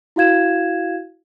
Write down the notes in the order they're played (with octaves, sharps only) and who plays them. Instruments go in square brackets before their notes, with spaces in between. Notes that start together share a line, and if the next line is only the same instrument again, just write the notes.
[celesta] E4 F#4 F5 G#6 E7